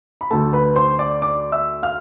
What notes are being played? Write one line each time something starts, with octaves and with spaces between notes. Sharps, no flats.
B5
D2 D3 A3 A4 A5
B4 B5
C5 C6
D5 D6
D5 D6
E5 E6
F5 F6